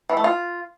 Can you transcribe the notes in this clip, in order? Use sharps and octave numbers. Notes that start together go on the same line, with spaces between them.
E3
A3
F4